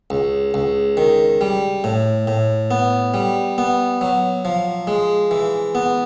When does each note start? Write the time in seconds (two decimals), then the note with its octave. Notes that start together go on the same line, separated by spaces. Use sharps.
0.10 C#2
0.54 C#2
0.97 D#3
1.41 G3
1.84 A2
2.27 A2
2.71 B3
3.14 G3
3.58 B3
4.01 F#3
4.45 F3
4.87 G#3
5.31 E3
5.75 B3